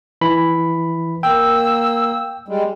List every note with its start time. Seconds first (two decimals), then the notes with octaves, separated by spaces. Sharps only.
0.21 E3 B5
1.23 A#3 G5 E6
2.48 G3 G#3